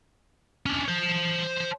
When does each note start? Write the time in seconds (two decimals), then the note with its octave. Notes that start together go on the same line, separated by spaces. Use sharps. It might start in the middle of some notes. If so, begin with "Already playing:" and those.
0.66 C#4 D4
0.88 C5 A5